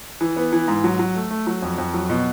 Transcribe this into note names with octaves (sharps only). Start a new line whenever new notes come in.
E3
B3
E3
G#2
F#3
F#3
A3
A3
F#3
F2
F2
F#3
B2